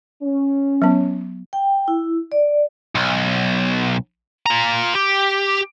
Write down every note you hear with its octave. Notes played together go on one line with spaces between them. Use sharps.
C#4
F#3 B3
G5
E4
D5
B1
F4 A#5
G4